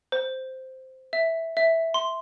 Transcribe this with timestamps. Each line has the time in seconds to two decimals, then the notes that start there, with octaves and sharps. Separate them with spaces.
0.12 C5
1.13 E5
1.57 E5
1.94 C6